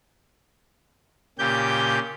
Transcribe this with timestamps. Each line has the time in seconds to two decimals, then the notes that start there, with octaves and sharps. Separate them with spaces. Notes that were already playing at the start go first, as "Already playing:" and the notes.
1.39 A#2 C#3 G4 G6